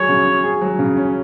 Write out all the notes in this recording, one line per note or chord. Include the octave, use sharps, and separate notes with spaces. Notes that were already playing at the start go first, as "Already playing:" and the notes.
Already playing: F#3 G#4 C#5
C#3
C#4
G#4
F#3
C#3
C#4